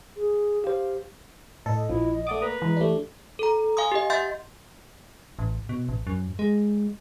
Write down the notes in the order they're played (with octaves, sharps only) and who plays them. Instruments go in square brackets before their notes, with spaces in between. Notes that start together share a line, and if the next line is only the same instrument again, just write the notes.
[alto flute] G#4
[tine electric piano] G4 C5 [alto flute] F5
[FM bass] A2 [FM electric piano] A4 [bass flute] D#5
[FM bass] A#1 [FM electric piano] F3 [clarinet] E4
[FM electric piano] A3 D5 D6 [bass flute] F#5 [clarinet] D#6
[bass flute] A#3 [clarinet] B4 [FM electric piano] A#5
[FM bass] E3 [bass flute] G#3
[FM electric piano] A3 D4 [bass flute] G4
[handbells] A4 A#5
F5 G#5 C6 D#6
G4 D#5
E5 F#5 C6 G6 A6
[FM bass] A1
B2
A1
F#2
G#3